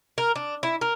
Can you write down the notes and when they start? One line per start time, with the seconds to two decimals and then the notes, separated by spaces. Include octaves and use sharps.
0.18 A#4
0.36 D4
0.63 E4
0.81 A#4